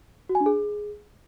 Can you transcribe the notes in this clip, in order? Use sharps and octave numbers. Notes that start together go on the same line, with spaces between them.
F#4
G#5
D4
G#4